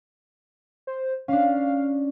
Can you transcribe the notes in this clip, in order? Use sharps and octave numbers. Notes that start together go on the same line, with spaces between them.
C5
C#4 D4 F5